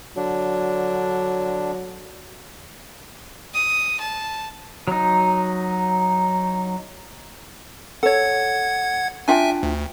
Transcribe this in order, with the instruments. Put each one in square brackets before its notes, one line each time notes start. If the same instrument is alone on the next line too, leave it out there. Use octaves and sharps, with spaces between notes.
[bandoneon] D3 D4 [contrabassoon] F#3
[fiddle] D#6
A5
[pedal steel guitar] F#3 D#4
[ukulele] A4 C#5 [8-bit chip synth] F#5 G#6
[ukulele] D4 F4 G5 [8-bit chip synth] E5 G#5
[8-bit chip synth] D2